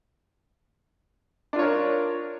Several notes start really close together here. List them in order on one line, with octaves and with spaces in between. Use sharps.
D4 F4 C#5 A#4